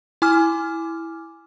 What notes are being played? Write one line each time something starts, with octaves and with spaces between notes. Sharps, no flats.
E4 G#5 D6 F6